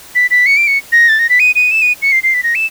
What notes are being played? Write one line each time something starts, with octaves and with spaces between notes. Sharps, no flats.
B6
B6
C#7
D7
C#7
A#6
A6
A#6
B6
D#7
D#7
E7
D#7
C#7
C7
C7
B6
A#6
E7